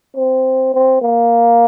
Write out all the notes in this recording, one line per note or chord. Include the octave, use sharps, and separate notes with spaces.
C4
C4
A#3